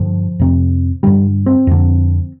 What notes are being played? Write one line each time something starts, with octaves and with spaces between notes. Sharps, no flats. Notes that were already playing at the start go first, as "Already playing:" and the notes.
Already playing: G2 D3 F3
F2 C3
G2 D3 G3
C4
F2 D3